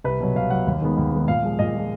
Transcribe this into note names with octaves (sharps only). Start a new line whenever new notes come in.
C2 B4
B2 F#3
C2 F5
F#3 F#5
B2
D#2
D#3 G#3 B3
D#2
D#3 G#3 B3
A#2 F5
F3 G#3
A#2 D#5
F3 G#3